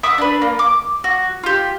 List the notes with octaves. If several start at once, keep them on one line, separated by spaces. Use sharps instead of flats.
E5 F#5 D6 D#6
D4 B4
A#3
D6
F#4
F4 G4